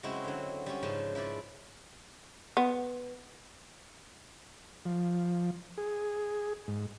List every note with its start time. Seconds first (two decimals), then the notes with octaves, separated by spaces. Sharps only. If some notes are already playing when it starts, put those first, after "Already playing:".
0.03 C#3 F#3 G#3 C4 E4 F#4
0.24 D3 F#3
0.66 G3 C#4
0.83 G#2 C#3 F3 B4
1.15 F3 E4 B4 D5
2.57 B3
4.86 F3
5.78 G#4
6.68 G#2